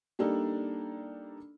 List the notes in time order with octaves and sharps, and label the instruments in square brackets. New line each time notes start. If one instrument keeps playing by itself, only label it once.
[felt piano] G3 A#3 D4 D#4 A4